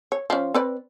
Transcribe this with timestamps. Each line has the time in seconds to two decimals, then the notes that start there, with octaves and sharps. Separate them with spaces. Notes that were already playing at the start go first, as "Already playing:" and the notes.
0.12 C#5
0.30 F3 C#4
0.54 C4 B4 D5